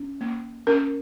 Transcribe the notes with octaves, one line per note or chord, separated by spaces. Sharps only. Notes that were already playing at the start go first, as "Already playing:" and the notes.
Already playing: C#4
A#3
C#4 A#4